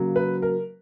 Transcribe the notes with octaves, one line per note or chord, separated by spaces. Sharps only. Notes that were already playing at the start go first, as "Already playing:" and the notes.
Already playing: C#3 F#3 A#3
B4
A#4